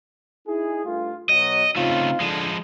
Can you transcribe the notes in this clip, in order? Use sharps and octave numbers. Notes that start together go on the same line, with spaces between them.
D#4 E4 G#4
G2 A3 F4
B2 F#3 D#5
C#3 A3 C4 D#4 F4
D3 F3 G#3